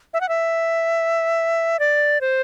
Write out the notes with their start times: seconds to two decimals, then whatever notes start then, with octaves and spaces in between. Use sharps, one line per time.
0.14 E5
0.21 F#5
0.29 E5
1.79 D5
2.21 C5